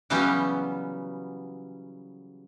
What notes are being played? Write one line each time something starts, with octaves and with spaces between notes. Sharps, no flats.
C#3 E3 F#3 G3 B3 C#4